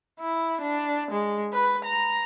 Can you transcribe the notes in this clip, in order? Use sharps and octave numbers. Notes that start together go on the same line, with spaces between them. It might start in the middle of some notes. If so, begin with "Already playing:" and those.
E4
D4
G#3
B4
A#5